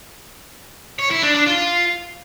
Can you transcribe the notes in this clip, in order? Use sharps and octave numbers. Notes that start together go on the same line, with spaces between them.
C#5
E4
D4
D4
F4